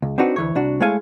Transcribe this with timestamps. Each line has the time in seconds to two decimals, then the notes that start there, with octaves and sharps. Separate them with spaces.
0.02 C#2
0.18 C4 D4 D#4 F#4 B4
0.36 D2 E3 C#5
0.55 C2 D4 F#4
0.80 G#3 A3 E4 C#5 F5 G#5